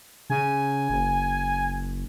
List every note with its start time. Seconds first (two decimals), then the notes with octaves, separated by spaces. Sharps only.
0.30 C#3 G#5
0.90 F#1